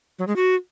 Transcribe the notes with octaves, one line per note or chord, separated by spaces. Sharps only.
F#3
G#3
F#4